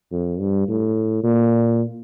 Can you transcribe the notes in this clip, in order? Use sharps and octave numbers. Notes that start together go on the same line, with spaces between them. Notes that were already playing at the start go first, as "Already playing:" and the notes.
F2
G2
A2
A#2